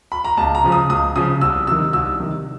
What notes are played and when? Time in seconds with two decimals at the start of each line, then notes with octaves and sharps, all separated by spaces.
0.12 B5
0.24 A#5
0.37 C#2 A5
0.55 A#5
0.64 C#3 F3
0.72 D#6
0.90 C#2 D#6
1.16 C#3 F3 D#6
1.41 C2 E6
1.67 C3 D#3 E6
1.93 C2 E6
2.20 C3 D#3